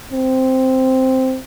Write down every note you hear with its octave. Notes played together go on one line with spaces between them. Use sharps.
C4